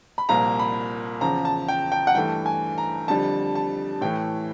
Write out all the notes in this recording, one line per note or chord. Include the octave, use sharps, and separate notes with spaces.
B5
C2 A#2 F3 A#3 A#5
B5
E2 C#3 F3 A#5
A5
G5
G5
F#5
G2 E3 A3 G5
G#5
A#5
F2 D3 G3 A5
A5
A2 E3 A3 G5